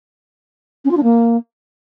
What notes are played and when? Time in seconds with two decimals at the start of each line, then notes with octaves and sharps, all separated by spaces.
0.85 C#4
0.91 F4
0.97 D4
1.03 A#3